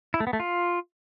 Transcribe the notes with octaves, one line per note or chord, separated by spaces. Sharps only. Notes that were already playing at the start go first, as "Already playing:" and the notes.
E4
A3
B3
A3
F4